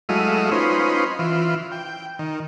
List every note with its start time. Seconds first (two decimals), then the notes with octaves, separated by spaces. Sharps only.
0.09 F#3 G#3 A3 E4 D#5 F5
0.51 C#4 D#4 F4 B4 C5
1.19 E3 F4
1.72 G5
2.19 D#3